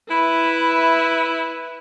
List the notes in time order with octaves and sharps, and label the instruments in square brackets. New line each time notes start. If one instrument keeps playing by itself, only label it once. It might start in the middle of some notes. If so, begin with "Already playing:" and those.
[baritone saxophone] E4 [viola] B4 E5 [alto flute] B5